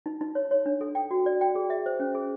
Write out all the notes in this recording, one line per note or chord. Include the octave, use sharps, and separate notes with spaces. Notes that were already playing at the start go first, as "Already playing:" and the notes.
D#4
D#4
C#5
C#5
D4
A4
G5
F#4
D5
G5
G#4
E5
C5
C#4
G#4